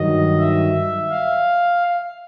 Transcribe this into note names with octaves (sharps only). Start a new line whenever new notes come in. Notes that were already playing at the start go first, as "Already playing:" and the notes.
Already playing: G2 D#3 F#3 D#5
E5
F5